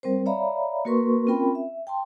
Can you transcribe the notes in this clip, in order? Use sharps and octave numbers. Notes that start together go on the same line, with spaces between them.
G3 C4 A#4 C5
C#5 D5 E5 F5 A#5 B5
A#3 F#4 A#4 B4 C6 C#6
C4 C#4 F4 A#4 G5 B5
E5
G5 A5 C6